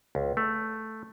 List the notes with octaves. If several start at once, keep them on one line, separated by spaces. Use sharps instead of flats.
C#2
A3